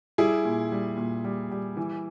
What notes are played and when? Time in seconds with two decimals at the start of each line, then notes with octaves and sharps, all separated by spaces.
0.18 G3 E4 G#4
0.45 A#2
0.72 G3
0.97 A#2
1.24 G3
1.51 G3
1.77 E3